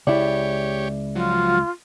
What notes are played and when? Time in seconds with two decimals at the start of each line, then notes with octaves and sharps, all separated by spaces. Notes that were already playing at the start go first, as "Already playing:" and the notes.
0.07 C#2 E4 G4 C#5 D5
1.15 F3 F#3 F4